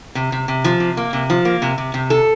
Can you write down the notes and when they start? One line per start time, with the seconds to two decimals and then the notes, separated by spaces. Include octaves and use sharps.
0.15 C3
0.32 C3
0.48 C3
0.64 F3
0.80 C3
0.97 A#3
1.13 C3
1.30 F3
1.45 A#3
1.62 C3
1.78 C3
1.94 C3
2.10 A4